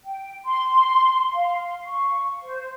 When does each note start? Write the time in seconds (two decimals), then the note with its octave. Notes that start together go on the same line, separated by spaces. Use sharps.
0.04 G5
0.45 C6
1.33 F5
1.84 C#6
2.43 C5